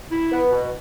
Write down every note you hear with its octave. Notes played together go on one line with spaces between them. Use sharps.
E4
B3
B2